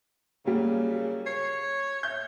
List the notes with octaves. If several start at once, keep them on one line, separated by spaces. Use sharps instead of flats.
C#3 F#3 G3 A#3
C#5 C7
E5 G6